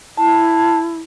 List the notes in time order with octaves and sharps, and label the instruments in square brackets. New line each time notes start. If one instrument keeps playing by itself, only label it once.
[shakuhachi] E4 [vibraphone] A5